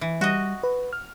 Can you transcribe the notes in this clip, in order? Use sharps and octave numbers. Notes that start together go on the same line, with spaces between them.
E3
G3 F#4 D#5
B4
F6